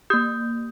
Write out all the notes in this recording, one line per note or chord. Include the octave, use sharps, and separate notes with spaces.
A#3 G4 D#6 G6